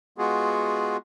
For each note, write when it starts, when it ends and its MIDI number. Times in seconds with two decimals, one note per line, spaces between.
0.18 0.97 56
0.18 0.97 59
0.18 0.97 65
0.18 0.97 66
0.18 0.97 68